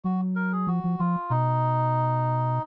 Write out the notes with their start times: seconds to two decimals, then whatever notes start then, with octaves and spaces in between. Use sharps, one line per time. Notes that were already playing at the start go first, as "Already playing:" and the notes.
0.04 F#3 F#4
0.36 A#4
0.52 G#4
0.67 F3 F#4
0.84 F3
0.99 F3 F4
1.30 B2 D#4